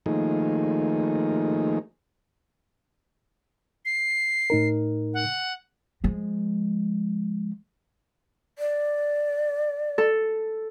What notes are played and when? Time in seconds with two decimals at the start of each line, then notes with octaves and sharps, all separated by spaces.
0.06 D#3 F3 A3 A#3 D#4 G#4
3.85 C7
4.50 A2 D#4 A#4
5.14 F#5
6.04 F3 G#3
8.59 D5
9.98 A4